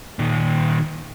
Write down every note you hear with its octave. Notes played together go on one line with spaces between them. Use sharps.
A#2 D#3